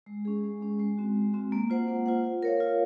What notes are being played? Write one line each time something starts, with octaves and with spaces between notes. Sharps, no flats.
G#3
C#4 G#4
G#3
C#4 G#4
G#3
C4 F#4
G#3
C4 F#4
A#3
F4 C5 F#5
A#3
F4 C5 F#5
F4
A#4 C#5 F5
F4